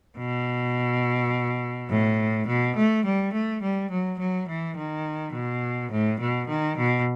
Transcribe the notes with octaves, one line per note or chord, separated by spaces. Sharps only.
B2
A2
B2
A3
G3
A3
G3
F#3
F#3
E3
D#3
B2
A2
B2
D#3
B2